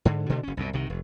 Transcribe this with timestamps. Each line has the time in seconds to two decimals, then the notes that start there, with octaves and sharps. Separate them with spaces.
0.05 G#2 D3
0.29 B2 D3 D#3 A3
0.43 F#1 C#4
0.57 C2 F#2 B2
0.73 C2 C3 D#3
0.90 F1